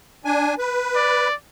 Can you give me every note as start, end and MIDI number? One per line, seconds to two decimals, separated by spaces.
0.25 0.54 62
0.25 0.54 80
0.58 1.28 71
0.95 1.34 74